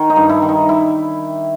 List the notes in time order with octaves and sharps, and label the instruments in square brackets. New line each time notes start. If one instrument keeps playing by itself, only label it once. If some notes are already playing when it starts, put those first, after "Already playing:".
Already playing: [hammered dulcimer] D#3
D#4
G2
E4
D#3
D#4
E4